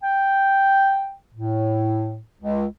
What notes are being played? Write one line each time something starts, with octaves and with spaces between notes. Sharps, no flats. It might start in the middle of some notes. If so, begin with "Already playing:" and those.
G5
A2
C#2